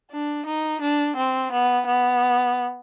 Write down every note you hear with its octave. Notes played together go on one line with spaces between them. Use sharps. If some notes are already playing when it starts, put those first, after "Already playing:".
D4
D#4
D4
C4
B3
B3